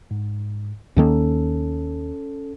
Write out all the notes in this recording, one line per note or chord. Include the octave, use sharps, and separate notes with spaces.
G#2
D#2 D#3 A#3 C#4 A4